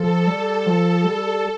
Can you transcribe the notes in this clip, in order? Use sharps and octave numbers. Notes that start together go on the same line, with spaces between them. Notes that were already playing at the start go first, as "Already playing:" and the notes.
Already playing: F3 A4
G3
F3
G3